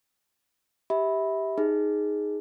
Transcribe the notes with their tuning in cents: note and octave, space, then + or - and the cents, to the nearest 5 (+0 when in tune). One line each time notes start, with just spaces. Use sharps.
G4 +0 E5 -25 B5 +0
D#4 +0 G#4 +0